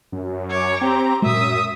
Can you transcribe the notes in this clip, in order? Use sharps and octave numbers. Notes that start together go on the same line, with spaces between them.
F#2
C#5 D6
C4 G4 A#5
F#2 A#2 G#3 E5 D#6